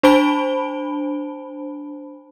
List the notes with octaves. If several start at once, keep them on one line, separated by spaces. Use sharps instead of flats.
D4 C5 A5 B5 D7 G7